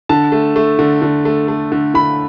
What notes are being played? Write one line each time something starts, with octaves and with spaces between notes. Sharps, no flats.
D3 A5
A3
A3
D3
D3
A3
A3
D3
D3 B5